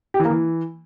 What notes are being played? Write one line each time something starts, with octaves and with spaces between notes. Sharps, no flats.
G4
E3
A#3
E3